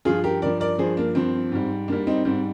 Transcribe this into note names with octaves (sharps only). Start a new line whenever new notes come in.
G2 F3 F4 G#4
G4 A#4
G2 F3 A#4 D5
A#4 D5
G2 F3 G#4 C5
A#3 D4
G2 F3 C4
G#2 G3
G#2 G3 A#3 D4
C4 D#4
G#2 G3 C4